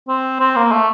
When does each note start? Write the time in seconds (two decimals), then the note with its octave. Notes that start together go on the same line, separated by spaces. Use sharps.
0.08 C4
0.40 C4
0.56 A#3
0.72 A3